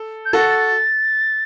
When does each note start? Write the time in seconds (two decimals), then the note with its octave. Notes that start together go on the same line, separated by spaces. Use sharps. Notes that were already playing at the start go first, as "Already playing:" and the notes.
Already playing: A4
0.26 G6
0.33 F#4 A4 A6